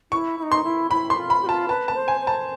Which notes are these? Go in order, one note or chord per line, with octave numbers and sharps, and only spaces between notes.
E4 C#6
E4
D#4
C6
E4
E4 B5
C6
F4
B5
G4
F4 A5
B4 A5
A5
C5
G#5
C5
A5